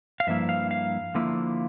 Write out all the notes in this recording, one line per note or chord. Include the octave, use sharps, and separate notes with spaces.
F5
G2 F3 A#3 E4 E5
F5
F5
D3 F3 A#3 E4